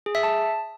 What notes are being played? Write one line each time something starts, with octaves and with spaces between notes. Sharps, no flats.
G#4
E5
A5